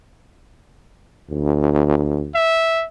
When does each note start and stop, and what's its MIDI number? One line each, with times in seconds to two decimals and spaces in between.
1.30 2.32 38
2.35 2.85 76